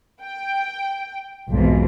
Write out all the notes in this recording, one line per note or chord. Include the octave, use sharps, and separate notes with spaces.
G5
B1 F2 G#2 B2 E3